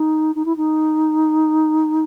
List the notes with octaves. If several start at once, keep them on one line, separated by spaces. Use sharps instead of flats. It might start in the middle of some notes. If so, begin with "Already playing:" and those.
Already playing: D#4
D#4
E4
D#4